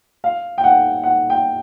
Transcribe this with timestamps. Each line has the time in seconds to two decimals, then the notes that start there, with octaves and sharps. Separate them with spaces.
0.24 F5
0.58 G5
0.64 F#5
1.03 F#5
1.30 G5